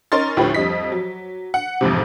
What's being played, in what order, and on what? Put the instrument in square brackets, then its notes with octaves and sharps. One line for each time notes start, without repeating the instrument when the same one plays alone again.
[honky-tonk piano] C#4 D#4 A#4 C6 A6
D2 A2 F3 G4 B4
F2 G3 D#5 B6
F#3
F#5
A1 F2 G#2 C3